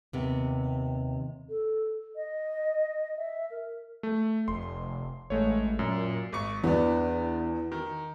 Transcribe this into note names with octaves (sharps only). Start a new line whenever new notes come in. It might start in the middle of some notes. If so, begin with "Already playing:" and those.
D#2 C3 B3
A4
D#5
E5
A#4
A3
F1 C6
A1 G#3 A3 C#5
F#2 A#2
G#1 C#6
E2 B3 D4
D#3